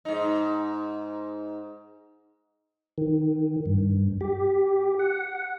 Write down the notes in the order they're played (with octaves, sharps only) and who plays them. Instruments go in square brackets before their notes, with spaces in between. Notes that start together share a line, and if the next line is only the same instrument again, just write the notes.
[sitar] G#2 D#4
[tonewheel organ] D#3
G2
G4
F#5